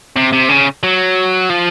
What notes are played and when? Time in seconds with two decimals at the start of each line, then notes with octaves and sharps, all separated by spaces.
0.16 C3
0.33 C3
0.49 C#3
0.83 F#3
1.50 F3